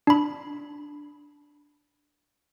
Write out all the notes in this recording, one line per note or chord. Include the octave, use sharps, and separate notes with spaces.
D4 B5